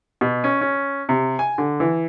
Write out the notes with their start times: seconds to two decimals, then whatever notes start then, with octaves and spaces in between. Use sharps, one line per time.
0.21 B2
0.44 C#4
0.61 C#4
1.09 C3
1.39 G#5
1.58 D3
1.80 E3